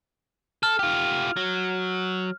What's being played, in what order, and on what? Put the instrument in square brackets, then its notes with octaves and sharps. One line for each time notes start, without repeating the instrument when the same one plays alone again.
[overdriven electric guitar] A4 [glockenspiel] F6
[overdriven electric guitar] F4 G4
F#3